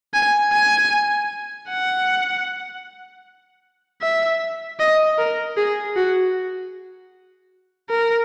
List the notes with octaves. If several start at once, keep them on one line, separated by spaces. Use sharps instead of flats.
G#5
G#5
F#5
E5
D#5
A#4
G#4
F#4
A#4